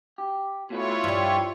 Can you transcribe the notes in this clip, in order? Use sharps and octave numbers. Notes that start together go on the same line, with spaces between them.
G4
B2 A3 E4 F4 B4 C#5
G2 F3 G3